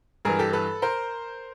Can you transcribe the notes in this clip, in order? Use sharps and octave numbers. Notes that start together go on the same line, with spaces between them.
G2 E3 G#4 A#4
G4 A4
A4 B4
A#4 C5